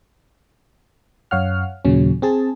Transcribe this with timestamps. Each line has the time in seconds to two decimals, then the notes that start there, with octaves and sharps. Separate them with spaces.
1.31 F#2 C#5 F5 F#5 F6
1.85 D#2 A#2 C#3 F#3 C#4
2.22 C4 G#4 A5